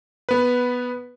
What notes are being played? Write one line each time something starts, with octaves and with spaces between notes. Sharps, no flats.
B3 B4